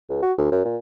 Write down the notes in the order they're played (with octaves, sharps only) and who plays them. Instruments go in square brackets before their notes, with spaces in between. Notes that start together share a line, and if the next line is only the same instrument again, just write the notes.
[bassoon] C#2
F#4
D2
F#2
A#2